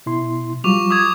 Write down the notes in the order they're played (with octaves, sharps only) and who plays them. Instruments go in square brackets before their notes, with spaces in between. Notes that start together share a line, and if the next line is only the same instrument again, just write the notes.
[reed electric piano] B2 E4 C6
[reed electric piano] F#3 G3 F4 [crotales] C#6 D6 F7
[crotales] D6 D#6 G#6